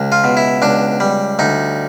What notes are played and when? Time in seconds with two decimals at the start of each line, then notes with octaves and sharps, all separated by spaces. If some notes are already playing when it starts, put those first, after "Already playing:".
Already playing: C#2
0.12 F4
0.24 B2
0.37 E4
0.62 C#2 D4
1.00 G3
1.39 D2 D#4